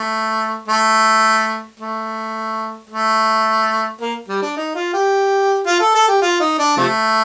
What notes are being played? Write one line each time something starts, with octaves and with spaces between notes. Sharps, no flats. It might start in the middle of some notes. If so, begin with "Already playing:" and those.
Already playing: A3
A3
A3
A3
A#3
G3
D4
D#4
F4
G4
F4
A4
A4
G4
F4
D#4
D4
C3 F3 A3